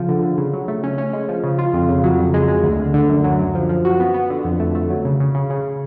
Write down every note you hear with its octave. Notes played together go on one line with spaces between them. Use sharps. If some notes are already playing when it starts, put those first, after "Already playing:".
Already playing: C#3 F3
D3
D3
C#3
F#3
A3
C#4
C#4
G#3
F3
C#3
F4
F2
C#3
F#3
F2
G#3
G#3
D2
D2
D3
F#2
F#3
F#2
F3
F3
F#4
B3
B3
D3
F2
A3
A3
F#3
C#3
C#3
C#3
C#3